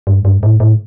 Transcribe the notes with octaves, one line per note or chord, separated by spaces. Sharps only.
G2
G2
A2
A2